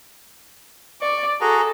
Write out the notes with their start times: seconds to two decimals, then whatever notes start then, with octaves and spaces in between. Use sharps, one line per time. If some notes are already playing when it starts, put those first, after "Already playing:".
1.01 D5 C#6
1.41 F#4 G#4 A4 A#5